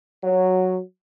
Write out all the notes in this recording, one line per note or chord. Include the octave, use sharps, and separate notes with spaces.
F#3